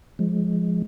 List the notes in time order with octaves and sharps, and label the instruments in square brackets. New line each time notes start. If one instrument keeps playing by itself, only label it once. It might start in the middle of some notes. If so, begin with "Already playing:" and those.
[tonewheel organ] F3 G#3